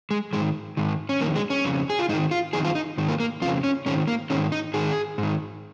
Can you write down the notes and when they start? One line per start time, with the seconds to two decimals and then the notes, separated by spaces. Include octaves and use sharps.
0.11 G#3
0.33 D#3 G#3
0.36 G#2
0.77 G#2 D#3
1.09 C#4
1.21 F2 D#3 A#3
1.36 G#3
1.50 C#4
1.65 F2 C#3
1.90 G#4
1.99 F4
2.09 G#2 D#4
2.14 D#3
2.31 F4
2.53 F2 D#3 G#4
2.65 F4
2.75 D#4
2.98 G#2 D#3
3.08 A#3
3.20 A#3
3.42 F2 F4
3.46 C#3
3.64 C#4
3.86 G#2 D#3 C#4
4.08 A#3
4.30 G#2 D#3 C#4
4.52 D#4
4.74 G#2 D#3 G#4
5.18 G#2 D#3